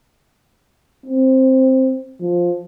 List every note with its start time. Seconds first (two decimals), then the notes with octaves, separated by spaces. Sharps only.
1.06 C4
2.21 F3